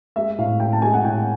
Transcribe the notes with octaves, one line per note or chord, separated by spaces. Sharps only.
G#3 E5
A2 F5
A2 G5
A5
G#3 G#5
F#5
A2 G5